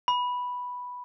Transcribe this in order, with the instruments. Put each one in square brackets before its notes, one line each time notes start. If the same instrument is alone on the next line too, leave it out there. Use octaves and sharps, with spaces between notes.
[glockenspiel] B5